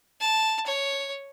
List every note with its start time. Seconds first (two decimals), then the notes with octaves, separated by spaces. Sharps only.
0.20 A5
0.66 C#5